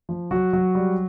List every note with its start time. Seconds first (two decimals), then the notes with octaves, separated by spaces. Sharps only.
0.09 F3
0.31 F#3 F#4
0.53 F#3
0.75 G3